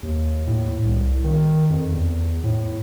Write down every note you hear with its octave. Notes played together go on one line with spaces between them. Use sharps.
D#2
A2
C2
D#3
F2
E2
A2